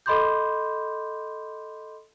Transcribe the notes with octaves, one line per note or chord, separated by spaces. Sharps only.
A4 D#5 B5 C6 D6 G6